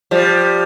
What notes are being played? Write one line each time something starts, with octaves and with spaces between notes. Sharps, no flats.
F3 G3